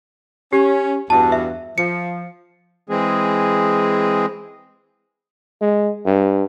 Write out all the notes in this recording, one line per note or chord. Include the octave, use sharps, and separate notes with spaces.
C#4 G4
E2 G2 F#4 A5
E5
F3 C#7
E3 G#3 C4 G#4
G#3
G2